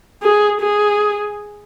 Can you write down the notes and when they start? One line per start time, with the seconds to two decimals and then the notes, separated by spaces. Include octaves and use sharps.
0.22 G#4
0.61 G#4